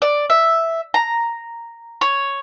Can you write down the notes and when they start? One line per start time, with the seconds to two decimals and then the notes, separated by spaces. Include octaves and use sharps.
0.02 D5
0.30 E5
0.94 A#5
2.01 C#5